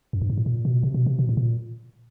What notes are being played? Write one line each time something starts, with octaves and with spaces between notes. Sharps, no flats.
F#2
G2
G#2
A2
A#2
B2
C3
B2
C3
B2
A2
A#2